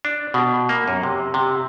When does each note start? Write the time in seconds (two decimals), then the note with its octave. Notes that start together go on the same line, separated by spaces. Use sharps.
0.05 D4
0.34 B2
0.69 A#3
0.88 F#2
1.03 C3
1.34 C3